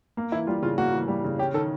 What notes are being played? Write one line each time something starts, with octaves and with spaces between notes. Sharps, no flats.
A#3
E3 E4
G3 F4
C#3 F4
A#3 F#4
E3
G3
C#3
C#4 G4
D#3 A4